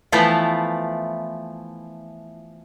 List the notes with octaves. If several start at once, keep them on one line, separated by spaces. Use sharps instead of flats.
E3 F3 A3 B3 E4 F4